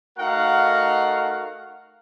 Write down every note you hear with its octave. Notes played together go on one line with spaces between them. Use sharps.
A3 D#4 F#4 A#4 F5 F#5